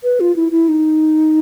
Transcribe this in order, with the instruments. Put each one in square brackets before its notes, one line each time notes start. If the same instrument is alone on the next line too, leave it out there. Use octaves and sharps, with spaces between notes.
[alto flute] B4
F4
E4
E4
D#4